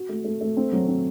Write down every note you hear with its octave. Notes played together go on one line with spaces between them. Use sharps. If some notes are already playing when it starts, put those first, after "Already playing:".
Already playing: F#4
A3
A3
A3
C4
F#3
C4